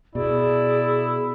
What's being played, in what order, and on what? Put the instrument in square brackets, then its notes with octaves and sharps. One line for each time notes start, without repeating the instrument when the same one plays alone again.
[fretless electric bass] B2 [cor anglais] E4 [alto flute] G#4 [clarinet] D5